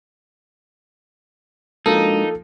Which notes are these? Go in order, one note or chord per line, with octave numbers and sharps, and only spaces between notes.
F3 G#3 A#3 D4 D#4 F#4 A4